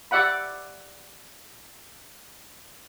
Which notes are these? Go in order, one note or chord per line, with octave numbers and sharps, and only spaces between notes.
G4 D5 E5 F#5 B5